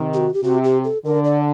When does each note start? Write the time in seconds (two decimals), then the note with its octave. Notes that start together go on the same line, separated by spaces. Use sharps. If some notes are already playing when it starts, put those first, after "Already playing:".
Already playing: C3 D#3
0.14 G4
0.17 F#4
0.34 G4
0.44 C3 F#4
0.64 G4
0.84 A4
1.05 D3 A#4
1.25 D5